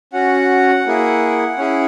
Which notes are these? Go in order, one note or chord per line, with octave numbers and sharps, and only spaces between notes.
C#4 F#4 F#5
A#3 E4 G#4
C#4 E4 G#4